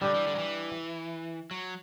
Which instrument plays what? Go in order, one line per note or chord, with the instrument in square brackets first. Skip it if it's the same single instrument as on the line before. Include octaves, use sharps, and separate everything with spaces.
[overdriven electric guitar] D3 [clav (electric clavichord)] G3 D4 G4
[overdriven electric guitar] E3
D3
F#3
E3
F#3